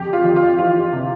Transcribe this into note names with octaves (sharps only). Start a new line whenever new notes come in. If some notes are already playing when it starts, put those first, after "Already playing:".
Already playing: F2 G4
F4
F2
F4
E3 F4
C3